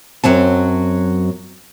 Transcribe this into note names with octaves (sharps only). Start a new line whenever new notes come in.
F#2 F#3 C4 A5